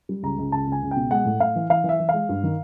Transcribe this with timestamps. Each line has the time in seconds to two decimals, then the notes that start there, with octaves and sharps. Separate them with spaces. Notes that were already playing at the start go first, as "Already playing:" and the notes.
0.09 G3
0.23 C#2 A#5
0.38 C#2
0.52 C#2 A5
0.67 C#2
0.72 G#5
0.82 C#2
0.91 B2 G5
1.11 G#3 F#5
1.25 A2
1.40 A2 F5
1.56 E3
1.70 E3 F5
1.84 E3
1.89 E5
2.00 E3
2.09 G#3 F5
2.29 G2
2.43 D#3